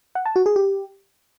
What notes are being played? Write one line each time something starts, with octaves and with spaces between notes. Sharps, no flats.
F#5
A5
F#4
G#4
G4